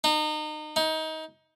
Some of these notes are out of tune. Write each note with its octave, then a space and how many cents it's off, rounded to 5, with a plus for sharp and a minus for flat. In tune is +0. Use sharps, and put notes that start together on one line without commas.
D#4 -30
D#4 +25